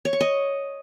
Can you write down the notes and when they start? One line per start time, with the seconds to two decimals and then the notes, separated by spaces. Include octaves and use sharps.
0.05 C#5
0.13 C#6
0.21 D#5